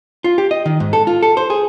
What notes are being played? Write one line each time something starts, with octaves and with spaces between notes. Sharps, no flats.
F4
G4
D#5
D#3
G#2
A4
F4
A4
C5
G#4